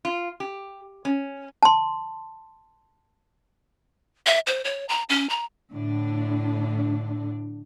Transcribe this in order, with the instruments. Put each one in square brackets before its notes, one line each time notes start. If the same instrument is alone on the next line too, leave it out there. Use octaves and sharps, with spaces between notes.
[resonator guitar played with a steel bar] F4
G4
C#4
[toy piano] A5 C6
[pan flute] E5
C5
C#5
A#5
C#4
A#5
[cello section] A2 D3 D4